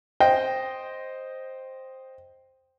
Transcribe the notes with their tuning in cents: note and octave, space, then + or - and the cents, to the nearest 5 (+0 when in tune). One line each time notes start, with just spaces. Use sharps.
C5 +5 D#5 +0 G5 +0